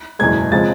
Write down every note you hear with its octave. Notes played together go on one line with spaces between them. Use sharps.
F#1 E2 B2 G#3 G#6
C#3 F3 G#3 C4 A6